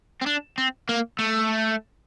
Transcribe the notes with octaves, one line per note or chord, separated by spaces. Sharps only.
C4
D4
C4
A#3
A3